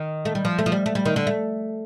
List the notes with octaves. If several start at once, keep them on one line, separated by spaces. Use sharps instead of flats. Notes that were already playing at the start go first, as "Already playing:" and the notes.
Already playing: D#3
A3
G3
F3
A3
F3
G3
A3
G3
D#3
D3
A3